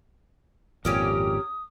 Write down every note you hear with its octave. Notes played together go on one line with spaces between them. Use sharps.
G#1 F2 A#2 C#4 G4 A#4 D#6